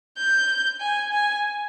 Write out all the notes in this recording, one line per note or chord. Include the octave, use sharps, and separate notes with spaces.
G6
G#5
G#5